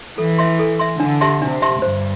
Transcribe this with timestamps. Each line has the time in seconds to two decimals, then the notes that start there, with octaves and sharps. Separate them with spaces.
0.18 E3 A4
0.38 E5 C6
0.59 A4
0.79 E5 C6
1.00 D3 D4
1.21 G4 E5 A5 C6
1.41 C3 D4
1.62 G4 E5 A5 C6
1.82 G2 C5